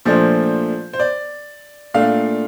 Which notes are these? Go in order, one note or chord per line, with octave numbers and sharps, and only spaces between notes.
A#2 F3 A3 D4 C5
C5
D5
A#2 A3 D4 F5